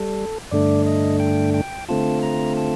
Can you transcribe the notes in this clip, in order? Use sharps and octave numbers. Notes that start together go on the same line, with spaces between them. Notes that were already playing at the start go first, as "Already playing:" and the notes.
Already playing: G3 A4
G2 D3 A3 D4 D5
D#5
G5
G5
D3 A3 C4 F4 A5
A#5
A5